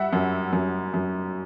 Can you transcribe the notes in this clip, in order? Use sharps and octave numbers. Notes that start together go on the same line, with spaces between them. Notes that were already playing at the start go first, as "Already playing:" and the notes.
Already playing: G3 E5 F#5
F#2
F#2
F#2